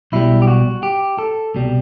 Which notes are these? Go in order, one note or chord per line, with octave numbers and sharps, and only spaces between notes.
B1 B2 G3 E4
G4
F#4
G4
A4
C2 B2 G3